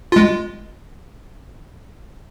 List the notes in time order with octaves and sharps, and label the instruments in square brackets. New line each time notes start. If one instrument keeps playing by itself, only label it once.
[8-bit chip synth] G#3 F4